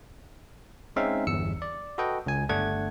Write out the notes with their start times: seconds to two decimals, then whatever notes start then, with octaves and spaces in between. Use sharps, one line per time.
0.96 G#3 C4 C#4 D#4 E5 F5
1.27 G1 E2 E6 C#7
1.62 D5
1.98 F#4 A4 B4 D#5 G5
2.26 C#2 G#5
2.49 G1 A3 D4 F#5 G#6